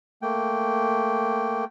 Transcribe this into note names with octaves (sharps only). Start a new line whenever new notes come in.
A3 A#3 G5